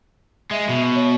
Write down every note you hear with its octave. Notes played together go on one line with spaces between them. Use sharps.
G#3 E5
B2
C#5